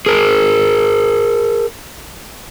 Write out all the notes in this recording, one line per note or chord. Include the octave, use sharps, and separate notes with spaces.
G#4 A#4